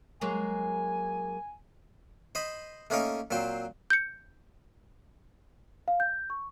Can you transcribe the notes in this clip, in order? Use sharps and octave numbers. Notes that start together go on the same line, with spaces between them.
F#3 G#3 A#3 G#5
C5 D#5 B5
A3 A#3 C#4 D#4 A#4
A#2 F#3 C4 C5 C6
G6 C#7
F5
G6
C#6